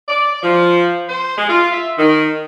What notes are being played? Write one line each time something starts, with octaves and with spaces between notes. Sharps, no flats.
D5
F3
C5
G#3
F4
E5
D#3